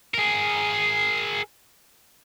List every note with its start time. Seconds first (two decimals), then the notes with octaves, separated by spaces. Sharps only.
0.14 G#4 A#4